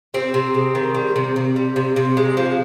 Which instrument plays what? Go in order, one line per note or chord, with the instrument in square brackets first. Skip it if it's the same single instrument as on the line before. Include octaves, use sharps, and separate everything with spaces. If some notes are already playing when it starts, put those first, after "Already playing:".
[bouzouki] C3 C4
C3
G#3
D#3
G3
C3
C3
G3
C3
C3
G#3
F3